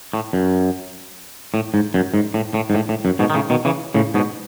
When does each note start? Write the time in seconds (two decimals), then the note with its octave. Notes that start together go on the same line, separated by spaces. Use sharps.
0.13 A2
0.33 F#2
1.54 A2
1.74 G#2
1.94 F#2
2.14 G#2
2.34 A2
2.54 A2
2.70 G#2
2.75 A2
2.89 A2
3.05 F#2
3.19 G#2 B2
3.30 D#3
3.34 A2 C#3
3.50 B2 D#3
3.65 C#3 E3
3.94 A2 C#3
4.14 G#2 B2